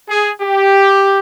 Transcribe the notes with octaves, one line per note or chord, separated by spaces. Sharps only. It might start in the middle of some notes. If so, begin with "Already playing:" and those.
G#4
G4